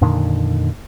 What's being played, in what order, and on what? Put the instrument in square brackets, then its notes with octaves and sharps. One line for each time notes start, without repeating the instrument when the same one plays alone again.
[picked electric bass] F2 A#2 D3 D#3